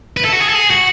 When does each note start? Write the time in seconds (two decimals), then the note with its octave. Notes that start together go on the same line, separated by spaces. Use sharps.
0.17 B4
0.25 A4
0.32 F#4
0.40 G#4
0.49 A4
0.55 G#4
0.70 F#4